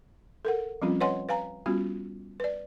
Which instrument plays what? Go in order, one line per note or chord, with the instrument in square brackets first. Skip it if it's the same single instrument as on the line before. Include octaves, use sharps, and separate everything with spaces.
[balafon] A4 A#4 F#5
F3 G3 C4 C#4 F4
B4 C#5 D#5 F#5 G#5 C6
B4 F5 G#5 A#5
G3 B3 C#4 F4 F#4
B4 D5